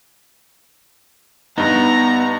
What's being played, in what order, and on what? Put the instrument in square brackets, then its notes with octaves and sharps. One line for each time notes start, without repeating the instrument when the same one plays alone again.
[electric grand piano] G2 D#4 [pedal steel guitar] B3 [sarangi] A#5